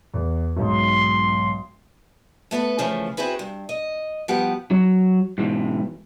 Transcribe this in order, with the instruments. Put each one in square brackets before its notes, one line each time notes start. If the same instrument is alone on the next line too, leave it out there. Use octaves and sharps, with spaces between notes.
[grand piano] E2
[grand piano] B1 G#2 [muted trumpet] C6
[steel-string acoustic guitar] A3 B3 A4 B4
C#3 E3 F3 A3
C4 E4 F#4 G#4 B4
G2
D#5
F3 G3 B3 G4 B4 F#5
[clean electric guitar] F#3
G#2 B2 E3